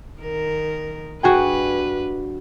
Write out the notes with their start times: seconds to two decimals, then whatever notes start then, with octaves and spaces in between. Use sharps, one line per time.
0.20 D#3 A#4
1.23 G2 D4 F#4 G#4 B4 G5